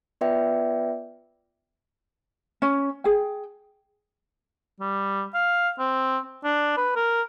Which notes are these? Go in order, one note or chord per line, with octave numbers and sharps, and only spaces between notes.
B3 F4 B4 D5 E5 G5
C#4
G#4 G5
G3
F5
C4
D4
B4
A#4